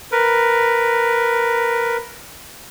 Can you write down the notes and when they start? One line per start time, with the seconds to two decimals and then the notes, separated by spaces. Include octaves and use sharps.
0.12 A#4 B4